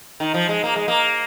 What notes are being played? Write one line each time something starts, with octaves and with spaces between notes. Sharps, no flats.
D#3
F3
G#3
A#3
G#3
A#3